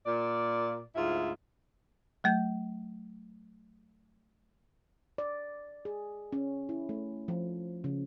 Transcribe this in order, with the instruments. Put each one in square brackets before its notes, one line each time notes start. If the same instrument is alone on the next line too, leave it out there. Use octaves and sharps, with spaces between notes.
[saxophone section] A#2 D5
D2 G#2 E4 F4
[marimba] F#3 A3 G6
[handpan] D5
G#4
C#4
E4
A3
F3
C#3